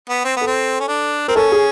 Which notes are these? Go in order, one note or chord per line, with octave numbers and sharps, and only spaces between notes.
B3
C4
B3 A4
C4
C#4
D4
C4 A#4
C#4 A4
G#4